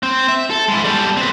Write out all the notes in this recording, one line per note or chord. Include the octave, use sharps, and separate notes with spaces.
C4
E5
A4
G#3 E4
G3 A4
C4 B4